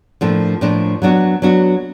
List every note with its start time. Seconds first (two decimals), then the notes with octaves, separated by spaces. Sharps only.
0.21 A2 F3 A#3 D4
0.61 A2 F3 A#3 D4
1.02 F#3 B3 D4 F#4
1.42 F#3 B3 D4 F#4